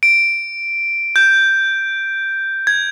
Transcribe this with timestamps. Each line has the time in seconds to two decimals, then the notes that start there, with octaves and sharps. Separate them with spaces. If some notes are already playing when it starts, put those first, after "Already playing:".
0.03 D7
1.16 G6
2.67 G#6